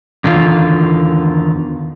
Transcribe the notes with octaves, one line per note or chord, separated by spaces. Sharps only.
E2 D3 D#3 F4